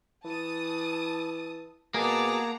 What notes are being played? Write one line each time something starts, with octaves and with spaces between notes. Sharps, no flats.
E3 A5 D#6
B2 A#3 G#4 F#5 A5 A#5 D6